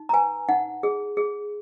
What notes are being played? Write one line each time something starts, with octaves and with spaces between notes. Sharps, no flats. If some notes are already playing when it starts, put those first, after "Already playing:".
Already playing: D#4
A#5
B4 G#5
D#4 F#5
G#4
G#4